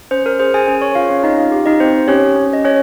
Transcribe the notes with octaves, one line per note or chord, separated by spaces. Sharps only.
C#4 C5
A#4
G#4 C5
G#4 G#5
C#4 G#4 G#5
C#5 C#6
F4 G#4 F5
C#4 C#5
C4 D#4 D#5
F4 F5
G4
D#4 D#5
C4 C5
C#4 G4 C#5
C#4
D#5
C#4 G4 C#5